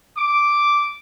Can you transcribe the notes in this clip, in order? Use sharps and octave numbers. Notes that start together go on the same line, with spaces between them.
D6